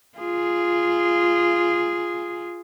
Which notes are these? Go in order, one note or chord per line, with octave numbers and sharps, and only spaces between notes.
F4 G#4